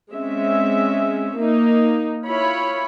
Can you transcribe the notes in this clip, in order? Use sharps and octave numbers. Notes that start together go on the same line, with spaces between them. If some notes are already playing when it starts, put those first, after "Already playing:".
G#3 C4 C#4 E5
A#3 D#4
E4 F4 C#5 B5